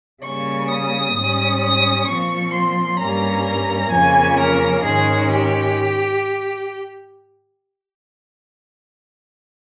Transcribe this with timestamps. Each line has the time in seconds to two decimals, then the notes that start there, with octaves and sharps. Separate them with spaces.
0.23 C#3 G3 A#3 C#6
0.70 D#6
1.16 G#2 G3 C#4
1.61 D#6
2.07 A#2 F3 C4 C#6
2.54 C6
3.00 G2 G3 A#3 C#4 A#5
3.92 F2 C#3 F3 A#3 C#4 G#5
4.39 A#4
4.84 G#2 D#3 G#3 C#4 G#4
5.31 G4